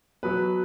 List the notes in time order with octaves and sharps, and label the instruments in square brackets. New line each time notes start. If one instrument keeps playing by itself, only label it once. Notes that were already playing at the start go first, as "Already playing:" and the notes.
[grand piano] B2 F#3 B4